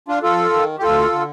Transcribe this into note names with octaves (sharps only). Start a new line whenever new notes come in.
D4 F4
F2 F4 A4
D#3
G4
D2 F4 A4
D3